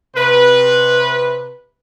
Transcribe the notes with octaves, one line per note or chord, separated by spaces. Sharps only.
C3 B4